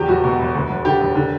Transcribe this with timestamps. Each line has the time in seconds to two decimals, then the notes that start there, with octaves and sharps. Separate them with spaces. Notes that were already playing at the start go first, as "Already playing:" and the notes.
Already playing: E2 G4
0.08 E1 F#4
0.24 B2
0.39 E1
0.55 D2
0.69 E1
0.85 D3 G4
1.00 E1
1.15 D3